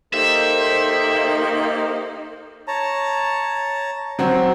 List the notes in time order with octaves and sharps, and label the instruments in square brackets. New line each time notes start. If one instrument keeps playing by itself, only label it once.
[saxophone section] A#3 D#4 [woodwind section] G4 A4 C5 [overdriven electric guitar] E5
[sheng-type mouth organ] C#5 A5 A#5
[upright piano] F#3 C4 F#4